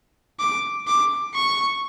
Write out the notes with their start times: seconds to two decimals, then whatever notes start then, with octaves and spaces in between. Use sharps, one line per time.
0.39 D6
0.87 D6
1.34 C#6